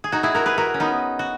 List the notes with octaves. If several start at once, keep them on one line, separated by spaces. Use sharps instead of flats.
G#4
D#4 F#4
E4 G#4
F#4 A#4
G#4 B4
F#4 A#4
C#4
B3 D#4
F#4